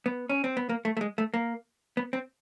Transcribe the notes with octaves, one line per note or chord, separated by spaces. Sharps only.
B3
C#4
C4
B3
A#3
A3
A3
G#3
A3
A#3
B3
C4